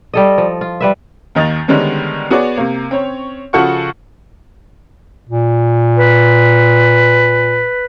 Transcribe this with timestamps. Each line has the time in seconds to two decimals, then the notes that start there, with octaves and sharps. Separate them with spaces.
0.14 G3 A4 D#5
0.38 F3
0.61 F4
0.81 G3 B4 E5
1.35 D#2 D#3 D#5 A6 F7
1.68 D3 D#3 G3 G#3 B3 C#4
2.30 B3 F#4 G#4 C#5 D5
2.57 C3 A#3
2.91 C4 C#4 C#5
3.53 C#3 F3 F#4 A4 F#5 C#6
5.29 A#2
5.97 B4